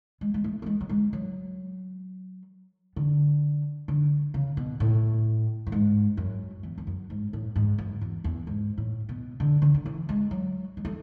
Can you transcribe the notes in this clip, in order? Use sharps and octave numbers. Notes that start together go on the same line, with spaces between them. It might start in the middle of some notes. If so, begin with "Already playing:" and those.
G#3
G#3
A3
A3
G#3
F#3
G#3
F#3
D3
D3
C#3
B2
A2
A2
G#2
F#2
E2
E2
F#2
G#2
A2
G#2
F#2
E2
E2
G#2
A2
B2
D3
D3
D3
E3
G#3
F#3
G#3
A3